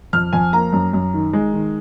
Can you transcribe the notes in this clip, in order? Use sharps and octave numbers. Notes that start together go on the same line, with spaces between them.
F2 F6
F2 G#5
A#3 A#5
F#2
F#2
D#3
G#3
D#3